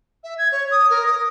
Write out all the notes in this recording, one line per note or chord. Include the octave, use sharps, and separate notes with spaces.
E5
G#6
C#5
D#6
A#4
D#6